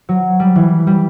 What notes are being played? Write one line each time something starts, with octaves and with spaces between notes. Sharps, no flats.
F#3
G3
E3
G3